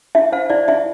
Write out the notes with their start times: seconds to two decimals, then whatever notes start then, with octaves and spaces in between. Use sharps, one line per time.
0.15 E4 E5
0.32 C5 F5
0.50 E4 D5
0.68 E4 E5